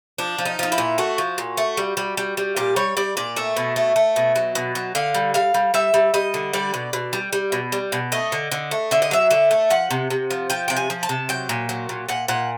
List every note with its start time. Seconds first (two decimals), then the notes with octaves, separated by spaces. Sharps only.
0.18 F3 D4
0.38 F3
0.45 D#4
0.59 F3 D#4
0.72 E4
0.78 A#2
0.98 A3 F#4
1.18 F3
1.38 A#2
1.57 A3
1.77 G3
1.97 G3
2.17 G3
2.37 G3
2.57 A#2 G4
2.76 G3 C#5
2.97 G3 D5
3.17 A#2 D5
3.36 A3 E5
3.56 B2
3.76 A3
3.96 A3
4.16 B2
4.36 F#3
4.55 B2
4.75 F#3
4.95 D3 F5
5.15 G3
5.34 G3 F5
5.54 G3
5.74 G3 E5
5.94 G3
6.14 G3 D#5
6.34 D3
6.53 G3 D5
6.74 B2
6.93 B2
7.13 G3
7.33 G3
7.52 B2
7.72 G3
7.92 B2
8.12 A3 D#5
8.32 D3
8.52 D3
8.71 A3
8.91 D3 E5
9.02 D#5
9.11 F#3 E5
9.31 D3 E5
9.51 A3
9.70 F3 F#5
9.90 C3
10.10 C3
10.31 F3
10.50 F3 G5
10.68 C3 G5
10.77 G#5
10.90 F3
11.03 A5
11.09 C3
11.29 F#3 G5
11.49 A#2
11.69 F#3
11.89 A#2
12.09 A#2 F#5
12.28 A#2 F#5